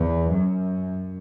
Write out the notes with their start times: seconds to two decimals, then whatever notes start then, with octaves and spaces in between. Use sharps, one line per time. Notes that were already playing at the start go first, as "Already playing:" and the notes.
Already playing: E2
0.30 F#2